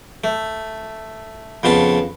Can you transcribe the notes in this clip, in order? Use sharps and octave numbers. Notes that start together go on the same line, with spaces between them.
A3
F2 C#3 B3 A5